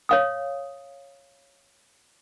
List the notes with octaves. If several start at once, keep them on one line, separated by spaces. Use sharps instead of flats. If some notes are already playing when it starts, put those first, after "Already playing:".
C#5 F5 D#6